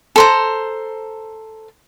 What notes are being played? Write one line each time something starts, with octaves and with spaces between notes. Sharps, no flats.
A4 C5 A#5